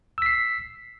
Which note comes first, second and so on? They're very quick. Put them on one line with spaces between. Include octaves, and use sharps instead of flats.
E6 B6 C7